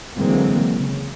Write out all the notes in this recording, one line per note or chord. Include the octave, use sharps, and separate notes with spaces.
D3 E3 F#3 G#3 A#3 C4
C#3